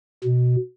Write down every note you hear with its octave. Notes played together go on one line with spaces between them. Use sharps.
B2